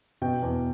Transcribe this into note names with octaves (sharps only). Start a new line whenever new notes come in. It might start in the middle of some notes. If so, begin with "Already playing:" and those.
B2 G5
E2